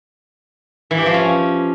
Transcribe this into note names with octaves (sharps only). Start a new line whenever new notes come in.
E3
G4
F3
C#4